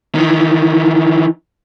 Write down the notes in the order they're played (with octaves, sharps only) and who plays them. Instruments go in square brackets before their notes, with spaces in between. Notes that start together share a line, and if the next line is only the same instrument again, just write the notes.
[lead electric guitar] D#3 E3